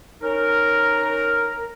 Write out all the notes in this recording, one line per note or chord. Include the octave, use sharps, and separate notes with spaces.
C#4 D#4 A#4